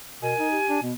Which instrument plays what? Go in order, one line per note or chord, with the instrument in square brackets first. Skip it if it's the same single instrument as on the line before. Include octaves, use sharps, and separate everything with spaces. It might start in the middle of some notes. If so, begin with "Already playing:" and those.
[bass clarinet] B2 [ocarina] A#4 [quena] G#5
[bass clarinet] D#4
[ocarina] G4
[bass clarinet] D4
[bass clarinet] B2 [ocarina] B3